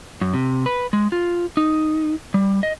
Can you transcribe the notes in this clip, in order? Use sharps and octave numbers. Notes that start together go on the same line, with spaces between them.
F#2
C3
B4
G#3
F4
D#4
G3
D#5